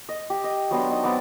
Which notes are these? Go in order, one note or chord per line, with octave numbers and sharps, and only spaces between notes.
D#5
G4
D#5
F#3 B3 D4 C6
D#4
B3 C4 D5 A5